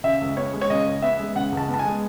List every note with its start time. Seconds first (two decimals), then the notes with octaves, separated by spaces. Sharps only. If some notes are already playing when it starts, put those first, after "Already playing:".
0.04 C#3 E5
0.21 C#2
0.37 B3 C#5
0.53 G#3
0.61 C#5
0.70 C#3 D#5
0.86 C#2
1.02 B3 E5
1.19 G#3
1.35 C#3 F#5
1.52 C#2
1.57 A5
1.69 B3
1.74 A5
1.79 G#5
1.85 G#3